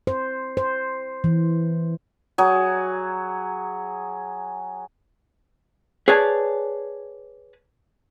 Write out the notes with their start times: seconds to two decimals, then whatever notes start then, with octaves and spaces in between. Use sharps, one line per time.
0.07 C5
0.57 C5
1.24 E3
2.38 F#3 G#4
6.08 G#4 B4 C#5 D5 G#5 A5